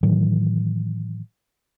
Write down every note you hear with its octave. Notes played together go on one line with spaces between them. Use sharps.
A2 D#3 E3 F#3